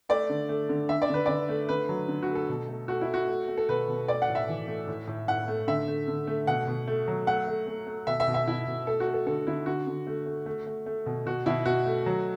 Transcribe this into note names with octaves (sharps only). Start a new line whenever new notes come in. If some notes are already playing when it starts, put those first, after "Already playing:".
A3 D5
D3
A3
D3
D3 E5
D5
D3 B4
D3 D5
A3
D3 B4
F#3
D3
F#4
A3
A4
B2
A3
A3 F#4
E4
A3 F#4
A3
A3
A4
B2 B4
B2
A3 D5
F#5
A2
E5
E3
A3
A2
A2
A2 F#5
A3
D3 E5
A3
D3
A3
B2 F#5
B2
A3
F#3
A3 F#5
A3
A3
A3
B2 E5
E5
B2
E5
B2 E4
B2
A3 A4
F#4
A3
A4
D3 A4
D3 E4
D3 F#4
D3
A3
A3
A3
A3
A3
B2
B2 F#4
B2 E4
B2 F#4
A3
F#3